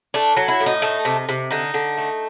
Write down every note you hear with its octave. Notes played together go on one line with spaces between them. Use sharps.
A3 D4
F#3
E4
A2
D#4
A3
C3
C3
D3 D#4
D3
A3